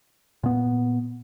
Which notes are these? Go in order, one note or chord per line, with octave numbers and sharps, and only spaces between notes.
A#2 B3